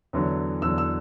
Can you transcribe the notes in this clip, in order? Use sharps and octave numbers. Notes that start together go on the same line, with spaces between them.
E2 D3 F#3
E2 D3 F#3 E6
E6